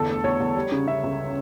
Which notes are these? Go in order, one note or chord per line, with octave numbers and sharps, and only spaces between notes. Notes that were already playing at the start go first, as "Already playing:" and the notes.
Already playing: G1 E2 A4
A3
E2 C#5
E2
G3
C#3
C#3 E5
C#2